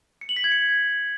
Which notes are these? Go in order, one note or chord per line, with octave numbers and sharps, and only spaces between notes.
C#7
F#7
B6
G#6
C#7